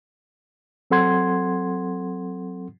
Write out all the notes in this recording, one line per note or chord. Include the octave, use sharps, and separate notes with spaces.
F#3 C4 A4 F#5 C6 G#6